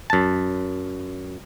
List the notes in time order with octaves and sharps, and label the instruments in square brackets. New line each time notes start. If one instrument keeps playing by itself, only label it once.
[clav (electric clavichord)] F#2 A5